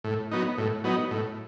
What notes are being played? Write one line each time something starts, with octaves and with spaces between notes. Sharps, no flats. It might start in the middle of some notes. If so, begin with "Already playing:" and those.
A2
F#3 B3 D#4
A2
F#3 B3 D#4
A2